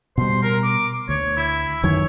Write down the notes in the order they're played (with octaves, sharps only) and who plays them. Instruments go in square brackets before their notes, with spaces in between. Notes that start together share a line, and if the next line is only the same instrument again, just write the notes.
[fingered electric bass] B2 G3 [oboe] C5
[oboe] A#4
D6
[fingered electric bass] D2 [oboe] C#5
[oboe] E4
[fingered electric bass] F#2 D#3 E3 [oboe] C#5